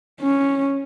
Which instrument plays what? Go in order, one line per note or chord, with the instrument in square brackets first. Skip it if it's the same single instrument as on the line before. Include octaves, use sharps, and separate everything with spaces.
[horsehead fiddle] C#4